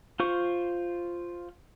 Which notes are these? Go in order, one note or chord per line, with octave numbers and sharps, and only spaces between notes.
F4 C5 C#6